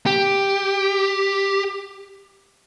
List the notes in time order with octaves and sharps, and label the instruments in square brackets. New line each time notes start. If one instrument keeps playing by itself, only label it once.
[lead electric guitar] G4